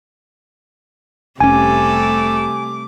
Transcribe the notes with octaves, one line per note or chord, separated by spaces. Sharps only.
F1 C3 G3 A3 C#4 A4 G#5 D6